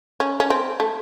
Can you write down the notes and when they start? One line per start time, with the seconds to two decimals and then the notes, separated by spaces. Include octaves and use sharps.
0.20 C#4
0.40 C#4
0.50 C4
0.80 A3